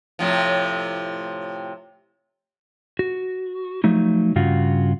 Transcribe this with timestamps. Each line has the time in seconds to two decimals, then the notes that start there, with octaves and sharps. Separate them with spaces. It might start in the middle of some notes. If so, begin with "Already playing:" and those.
0.19 A2 C3 F3
2.99 F#4
3.84 F3 F#3 A3 D#4
4.36 G2 C#3 F4 F#4